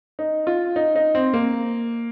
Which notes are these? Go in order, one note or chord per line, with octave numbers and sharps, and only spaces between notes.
D#4
F4
D#4
D#4
C4
A#3